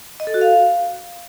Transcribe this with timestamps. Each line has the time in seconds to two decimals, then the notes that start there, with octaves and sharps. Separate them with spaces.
0.20 D#5
0.27 A4
0.34 F#4
0.41 F5